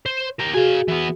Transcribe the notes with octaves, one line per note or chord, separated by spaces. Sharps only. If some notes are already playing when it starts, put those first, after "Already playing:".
C5
G4 A#4
F#4 G#4 F5 G#5
E3 B3